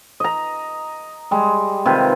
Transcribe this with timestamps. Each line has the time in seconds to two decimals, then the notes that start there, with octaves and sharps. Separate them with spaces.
0.20 D#5 A#5
1.31 G3 G#3
1.86 C3 D#3 F4 B4